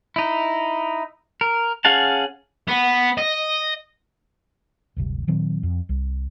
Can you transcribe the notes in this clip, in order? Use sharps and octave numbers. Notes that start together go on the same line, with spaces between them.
D#4 E4
A#4
C#4 G#4 F5 F#5 A5
B3
D#5
D1 G1 C3
A#2 D#3 F#3 C4
F2
C2